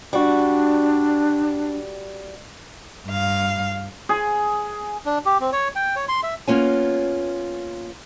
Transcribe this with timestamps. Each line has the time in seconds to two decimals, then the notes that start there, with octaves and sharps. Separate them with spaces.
0.13 G3 D4 F#4
3.07 G2 F5
4.09 G#4
5.06 D4
5.26 G4
5.41 C4
5.52 C#5
5.75 G5
5.96 C#5
6.09 C6
6.23 E5
6.47 A#3 B3 C#4 F4 C#5 G#5